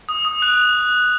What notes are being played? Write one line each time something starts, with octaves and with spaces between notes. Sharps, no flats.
D#6
D#6
F#6 F7